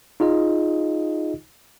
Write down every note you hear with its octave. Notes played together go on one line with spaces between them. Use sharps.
D#4 F4 G#4 D#5